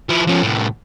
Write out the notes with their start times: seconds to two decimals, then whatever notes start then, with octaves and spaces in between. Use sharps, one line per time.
0.09 F3 E4
0.27 F3 C#4
0.43 C2 A2